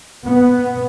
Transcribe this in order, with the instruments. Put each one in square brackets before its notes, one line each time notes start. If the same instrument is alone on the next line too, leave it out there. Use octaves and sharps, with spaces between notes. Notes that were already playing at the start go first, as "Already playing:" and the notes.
[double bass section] B3